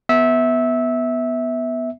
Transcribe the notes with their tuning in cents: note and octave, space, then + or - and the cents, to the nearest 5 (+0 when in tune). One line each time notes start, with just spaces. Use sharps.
B3 +0 E5 -15